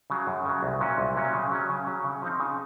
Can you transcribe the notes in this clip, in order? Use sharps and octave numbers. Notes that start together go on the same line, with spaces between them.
C#3 F#3
F#2
C#3 F#3
C2
A#2 F#3 C#4
C2
A#2 F#3 C#4
C#3
F#3 C#4
C#3
F#3 C#4
C#3
F3 C4 D#4
C#3